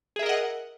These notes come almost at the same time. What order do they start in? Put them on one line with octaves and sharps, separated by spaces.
G#4 E5 A#4 D#5 F#5